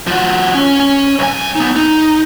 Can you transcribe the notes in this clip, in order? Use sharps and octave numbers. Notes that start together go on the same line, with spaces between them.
F3 F#4
C#4
C#4
B1 G#5
B3 D#4
D#4